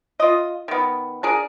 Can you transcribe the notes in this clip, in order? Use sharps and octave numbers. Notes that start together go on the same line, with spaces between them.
F4 D#5
D#3 B3
D4 G#4 A#4